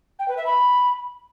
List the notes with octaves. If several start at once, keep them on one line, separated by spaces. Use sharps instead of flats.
G5
B4
E5
B5